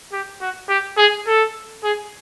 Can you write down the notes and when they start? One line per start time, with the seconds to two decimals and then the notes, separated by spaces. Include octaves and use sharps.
0.12 G4
0.41 F#4
0.69 G4
0.97 G#4
1.27 A4
1.84 G#4